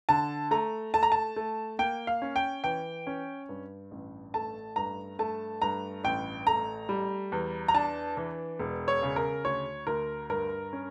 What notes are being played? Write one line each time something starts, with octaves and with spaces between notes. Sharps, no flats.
D3 A5
A3 A#5
A3 A5
A#5
A5
A3
A#3 G5
F5
C#4
G5
E3 G5
C#4
G2
A1
A3 A5
G2 A#5
A3 A5
G2 A#5
A1 G5
A3 A#5
G3
E2
A#5
D4 A5
E3
E1
C#5
C#3
A#4
D2 C#5
D2 A#4
G2 A#4
C#4